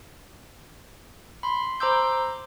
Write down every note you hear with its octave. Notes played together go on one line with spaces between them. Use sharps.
B5 C6
C5 A#5 C6 D6 E6 G6